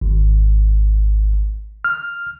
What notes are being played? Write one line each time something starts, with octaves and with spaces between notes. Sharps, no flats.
G#1
F6